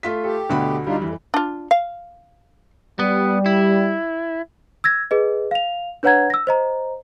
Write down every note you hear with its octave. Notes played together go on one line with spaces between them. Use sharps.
A3 F4 B6
G4 A4
D2 B2 D3 A3 F#4 B5
G3 D4 D#4 F4
F2 E3
D4 F4
F5
G3 B3
E4
E6 G#6 A#6
G#4 B4 D#5
F5 F7
D4 B4 C#5 F#5 A#5 G#6
E6 A#6
C5 D#5 A#5